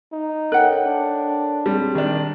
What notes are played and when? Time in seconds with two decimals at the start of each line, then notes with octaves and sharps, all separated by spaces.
0.12 D#4
0.52 A4 A#4 C#5 F#5 G5 F#6
0.86 D4
1.66 G3 C4 G#4
1.95 D#3 D4